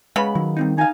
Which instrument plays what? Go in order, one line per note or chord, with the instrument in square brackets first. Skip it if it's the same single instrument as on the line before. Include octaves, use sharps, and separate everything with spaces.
[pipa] C#3 B3 B5 [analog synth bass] G#3
[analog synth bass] D#3 [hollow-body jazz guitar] F#3
[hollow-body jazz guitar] G3 C4 D#4
[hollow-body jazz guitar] D#4 F5 [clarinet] G#5